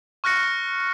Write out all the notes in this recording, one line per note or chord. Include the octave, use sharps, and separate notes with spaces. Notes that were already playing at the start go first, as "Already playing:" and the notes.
C#6 F6 F#6 A#6 C#7